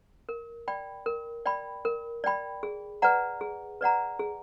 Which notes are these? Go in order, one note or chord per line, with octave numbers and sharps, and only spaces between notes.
A#4
D5 G5 B5
A#4
D5 G5 B5
A#4
D5 G5 B5
G#4
B4 D5 F#5 A#5
G#4
B4 D5 F#5 A#5
G#4